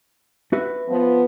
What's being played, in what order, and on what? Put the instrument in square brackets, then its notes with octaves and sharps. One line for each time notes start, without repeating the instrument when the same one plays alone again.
[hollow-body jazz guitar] F#4 B4 E5
[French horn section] F3 B3